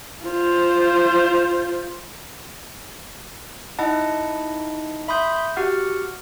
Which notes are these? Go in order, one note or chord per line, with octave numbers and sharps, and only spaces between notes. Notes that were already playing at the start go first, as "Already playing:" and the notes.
F4 C5
D#4 E4 D#5 F#5 A5
E5 B5 C6 D#6 G6
F#4 G4 F#5 F6